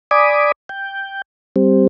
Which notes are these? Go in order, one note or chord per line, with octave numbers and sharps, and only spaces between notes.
D5 G#5 B5 D6 D#6
G5
G3 C4